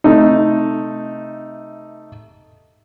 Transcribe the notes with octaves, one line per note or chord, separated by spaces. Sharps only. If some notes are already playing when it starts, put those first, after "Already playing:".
C3 A3 D#4